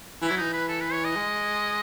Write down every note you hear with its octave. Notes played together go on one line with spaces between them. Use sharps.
E3
F#3 E4
E3 D#4
B4
A4
B4
C#5
D#5
G#3